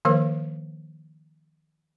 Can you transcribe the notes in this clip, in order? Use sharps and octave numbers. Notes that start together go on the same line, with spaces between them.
D#3 F3 A#3 A#4 F5